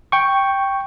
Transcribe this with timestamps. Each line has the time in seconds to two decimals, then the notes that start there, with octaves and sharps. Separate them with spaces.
0.12 G5 C#6